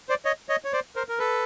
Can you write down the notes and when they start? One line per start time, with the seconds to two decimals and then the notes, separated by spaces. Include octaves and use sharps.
0.09 C5 D5
0.25 C#5 D#5
0.49 C#5 D#5
0.65 C#5
0.73 C5 D5
0.96 A#4 C5
1.09 A#4
1.19 A4 B4